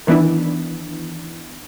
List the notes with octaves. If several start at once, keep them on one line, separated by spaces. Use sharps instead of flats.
D#3 E3 B3 D4 E4